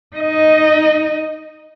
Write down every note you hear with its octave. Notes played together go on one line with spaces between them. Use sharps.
D#4 D#5